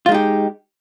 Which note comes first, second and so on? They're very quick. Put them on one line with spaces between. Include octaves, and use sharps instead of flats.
F4 G#3 D#4 G4